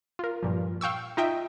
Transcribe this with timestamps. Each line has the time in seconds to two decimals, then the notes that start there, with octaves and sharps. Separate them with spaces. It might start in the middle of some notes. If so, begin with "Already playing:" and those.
0.19 F4 A#4
0.43 G2 A#2 F3
0.81 F5 G5 C#6 E6
1.17 D#4 F4 D#5 E5 G5